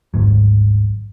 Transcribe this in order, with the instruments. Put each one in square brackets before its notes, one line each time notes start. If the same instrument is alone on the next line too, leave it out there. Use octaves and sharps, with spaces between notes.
[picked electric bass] G#1 D2 G#2 F#3